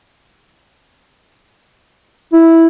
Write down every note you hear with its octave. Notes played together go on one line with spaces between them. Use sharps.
E4